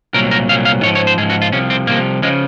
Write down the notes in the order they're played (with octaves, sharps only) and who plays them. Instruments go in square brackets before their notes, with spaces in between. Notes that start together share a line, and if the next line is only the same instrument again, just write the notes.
[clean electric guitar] C2 A#2 F#3 A#4
A#4
C2 A#2 F#3 F5
F5
G#2 C#5
F3
C#5
C5
G#2 G#4
F3
F#4
F4
C2 C3 F3 C#4
C4
C2 C3 F3 A#3
C#3 F3 G#3